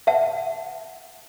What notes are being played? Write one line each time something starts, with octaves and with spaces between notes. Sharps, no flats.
E5 F#5 A5